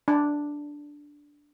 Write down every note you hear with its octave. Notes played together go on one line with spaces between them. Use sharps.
D4